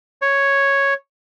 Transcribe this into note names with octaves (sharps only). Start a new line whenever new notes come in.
C#5